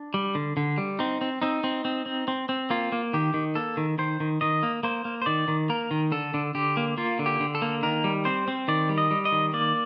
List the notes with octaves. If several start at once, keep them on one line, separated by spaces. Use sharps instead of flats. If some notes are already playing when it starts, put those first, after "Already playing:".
Already playing: D4
G3
D3
D3
G3
C4 D#4
C4
C4 D#4
C4
C4
C4
C4
C4
A#3 F4
A#3
D#3 G4
D#3
A#3 A4
D#3
D#3 C5
D#3
D#3 D#5
A#3
A#3 C5
A#3
C5
D#3 D5
D#3
A#3 A#4
D#3
D3 A4
D3
D3 G4
A#3
A#3 F4
D3
G4
D3
A4
A#3
D#3 A#4
G3
C4 C5
C4
D#3 D5
G3
D#5
G3
D#5
D#3
A#3 D5